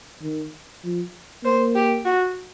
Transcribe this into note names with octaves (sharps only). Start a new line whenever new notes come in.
D#3
F3
A#3 C5
G4
F#4